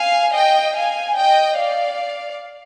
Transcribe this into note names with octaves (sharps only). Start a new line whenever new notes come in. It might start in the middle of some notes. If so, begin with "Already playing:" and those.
Already playing: F5 G#5
D#5 G5
F5 G#5
D#5 G5
D5 F5